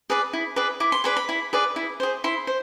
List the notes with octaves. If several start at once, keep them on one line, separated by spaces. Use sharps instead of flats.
G#4 B4 D5
E4
G#4 B4 D5
E4 D6
C6
G#4 B4 D5 B5
B5
E4 B5
G#4 B4 D5
E4
G#4 C5
E4 C6
C5